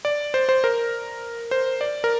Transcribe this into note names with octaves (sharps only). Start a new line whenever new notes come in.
D5
C5
C5
A#4
C5
D5
A#4